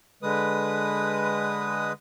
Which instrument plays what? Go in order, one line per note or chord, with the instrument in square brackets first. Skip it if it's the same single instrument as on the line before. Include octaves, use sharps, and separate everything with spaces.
[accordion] D3 G#3 B4 D#6